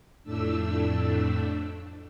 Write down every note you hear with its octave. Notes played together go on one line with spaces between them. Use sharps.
F2 A2 A3 D4 E6